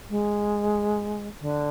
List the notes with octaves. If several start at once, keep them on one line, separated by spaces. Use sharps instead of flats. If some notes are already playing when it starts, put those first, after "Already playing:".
G#3
D3